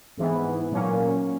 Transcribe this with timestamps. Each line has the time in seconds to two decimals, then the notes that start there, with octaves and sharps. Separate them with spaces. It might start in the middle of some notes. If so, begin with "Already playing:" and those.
0.17 G#2 E3 B3
0.71 A#2 F#3 A#3 C#4